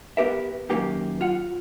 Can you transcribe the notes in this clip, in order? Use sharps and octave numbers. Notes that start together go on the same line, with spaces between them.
B3 G4 A#4 E5
F#2 D#3 A#3 G4
F4 F#5